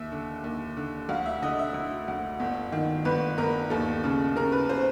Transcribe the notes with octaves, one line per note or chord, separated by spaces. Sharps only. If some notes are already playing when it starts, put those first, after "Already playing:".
Already playing: D#2 E5
D3
D#2
D3
D2 F5
E5
D3 D#5
E5
D2
D2
G1
D#3
G1 B4
G1 A#4
D#2 A4
C#3
C#3 A#4
B4
C5